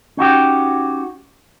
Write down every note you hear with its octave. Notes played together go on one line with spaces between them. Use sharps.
C#4 D#4 F#4 G4